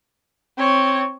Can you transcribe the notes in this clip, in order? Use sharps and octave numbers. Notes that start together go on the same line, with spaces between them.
C4 C#5